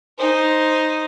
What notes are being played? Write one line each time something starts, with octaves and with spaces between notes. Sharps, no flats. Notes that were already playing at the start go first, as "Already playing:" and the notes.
D#4 C5